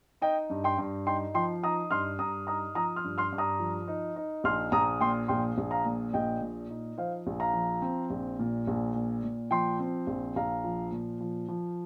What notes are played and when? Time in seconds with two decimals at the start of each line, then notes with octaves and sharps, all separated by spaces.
0.21 D#4 D#5 G5
0.50 G2
0.64 G5 C6
0.78 G2
1.06 D#4 G5 C6
1.34 F3 G5 C6
1.62 D#4 A#5 D#6
1.91 G2 C6 F6
2.19 G2 A#5 D#6
2.47 D#4 A#5 D#6
2.75 F3 A#5 D#6
2.96 C6 F6
3.04 G2
3.18 C6 F6
3.32 G2
3.38 A#5 D#6
3.59 F3
3.88 D#4
4.16 D#4
4.44 A#1 C6 F6
4.72 A#1 A#5 D#6
5.01 A#2 G5 C6
5.28 A#1 G5 C6
5.58 A#1
5.71 F5 A#5
5.85 A#2
6.13 A#1 D#5 G5
6.41 A#2
6.69 D#4
6.98 F3 C5 F5
7.27 A#1
7.40 F5 A#5
7.54 F3
7.82 C4
8.10 A#1
8.39 A#2
8.67 A#1
8.95 A#2
9.24 A#2
9.51 F3 G5 C6
9.79 C4
10.07 A#1
10.36 A#1 F5 A#5
10.64 F3
10.92 A#2
11.20 F3
11.49 F3